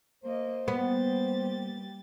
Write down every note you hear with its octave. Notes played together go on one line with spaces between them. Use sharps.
A#3 C5 D#5
G3 A#3 B3 G4 A6